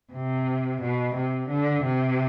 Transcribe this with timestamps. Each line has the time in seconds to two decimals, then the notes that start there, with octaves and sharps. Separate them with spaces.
0.13 C3
0.80 B2
1.14 C3
1.48 D3
1.82 C3